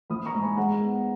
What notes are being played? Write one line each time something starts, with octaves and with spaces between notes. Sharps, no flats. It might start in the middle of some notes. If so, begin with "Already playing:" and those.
A#1 B5 D#6
A#5 C#6
G#2
G#5 B5
G#3 F#5 A#5
B3